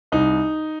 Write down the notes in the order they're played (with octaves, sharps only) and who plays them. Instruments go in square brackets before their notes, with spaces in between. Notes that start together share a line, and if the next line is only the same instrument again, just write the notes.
[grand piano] C2 D#4